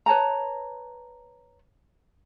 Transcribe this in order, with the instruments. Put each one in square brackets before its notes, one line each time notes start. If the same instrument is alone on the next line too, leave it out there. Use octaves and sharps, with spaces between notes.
[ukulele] B4 C#5 A5 A#5